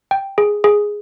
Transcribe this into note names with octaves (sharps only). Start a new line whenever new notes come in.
G5
G#4
G#4